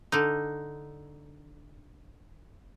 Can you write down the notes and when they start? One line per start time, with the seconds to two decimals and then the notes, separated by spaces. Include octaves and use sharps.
0.12 D3 D#4